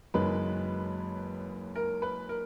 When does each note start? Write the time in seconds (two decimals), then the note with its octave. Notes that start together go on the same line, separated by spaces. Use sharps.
0.14 F#1 F#2 D#3 G#3 B4
1.75 A#4
2.02 B4
2.29 A#4